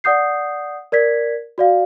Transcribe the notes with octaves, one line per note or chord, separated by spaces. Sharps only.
D5 F#5 D#6 G6 C7
A#4 D5 G#6 B6
F#4 D5 F5